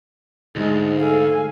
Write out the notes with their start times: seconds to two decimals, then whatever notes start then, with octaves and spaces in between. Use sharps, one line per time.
0.56 D2 G#2 G#3
1.00 A4 F5 G#5